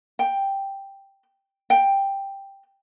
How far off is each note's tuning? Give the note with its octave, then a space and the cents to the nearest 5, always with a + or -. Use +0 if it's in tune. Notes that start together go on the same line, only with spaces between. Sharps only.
G5 +0
G5 +5